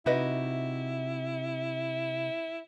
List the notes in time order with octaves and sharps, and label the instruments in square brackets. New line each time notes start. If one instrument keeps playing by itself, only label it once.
[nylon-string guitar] C3 F#4 [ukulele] D#4 B4 D#5 [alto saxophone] E4